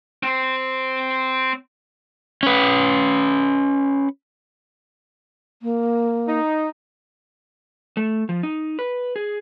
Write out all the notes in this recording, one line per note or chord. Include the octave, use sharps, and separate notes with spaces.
C4 C5
C#4 B4
A#3
D#4
A3
F3
D#4
B4
G#4